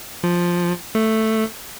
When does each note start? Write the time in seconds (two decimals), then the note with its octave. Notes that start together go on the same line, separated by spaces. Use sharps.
0.23 F3
0.95 A3